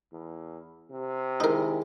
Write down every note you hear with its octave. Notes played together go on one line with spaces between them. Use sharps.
E2
C3
D#3 G#3 D#4 E4 A#4